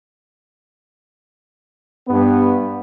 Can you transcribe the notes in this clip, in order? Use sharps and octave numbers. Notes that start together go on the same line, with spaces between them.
G2 B3